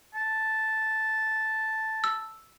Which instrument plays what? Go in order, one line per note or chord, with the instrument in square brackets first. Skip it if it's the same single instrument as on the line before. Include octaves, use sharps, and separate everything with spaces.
[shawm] A5
[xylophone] E6